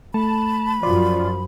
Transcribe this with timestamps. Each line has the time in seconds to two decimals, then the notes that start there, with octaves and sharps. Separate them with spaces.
0.14 A3 A5 B5
0.83 F#2 F3 F4 D5